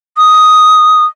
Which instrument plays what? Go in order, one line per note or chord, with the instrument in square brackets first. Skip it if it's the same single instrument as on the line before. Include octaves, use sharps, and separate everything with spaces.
[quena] D#6